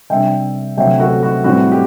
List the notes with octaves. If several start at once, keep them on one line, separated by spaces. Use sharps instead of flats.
C3 G3 D4 E5 G5
D2 C3 F#3 E5 G5
F#4 A4
F#4
A2 E3 G3 C4 F#4
G4